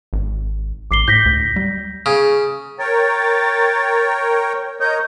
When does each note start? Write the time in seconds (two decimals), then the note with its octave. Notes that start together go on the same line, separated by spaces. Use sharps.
0.13 G#1
0.91 A1 D6 C7 G7
1.08 A2 G6 A#6 B6
1.26 D2
1.56 G3
2.06 C#3
2.79 A#4 C#5 G5 A6
4.80 A#4 C#5 D#5 G6